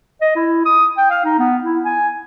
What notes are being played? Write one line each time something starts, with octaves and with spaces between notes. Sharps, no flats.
D#5
E4
D#6
G5
F5
D#4
B3
E4
G#5